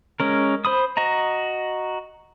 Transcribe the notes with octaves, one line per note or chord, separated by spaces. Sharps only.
G#3 C#4 A#4
C5 B5 D#6
F#4 D#5 A#5